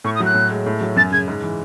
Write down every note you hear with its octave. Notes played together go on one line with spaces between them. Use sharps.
A2 C#6
D#6
F#3 F#6
A2
G#3
A2
F#3
F#2 A6
C#3 G#6
G#2
E3